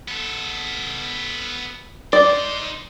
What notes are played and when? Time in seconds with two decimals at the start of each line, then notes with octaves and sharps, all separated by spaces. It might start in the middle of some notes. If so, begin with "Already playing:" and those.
0.08 B3 A4
2.13 D#4 C5 D5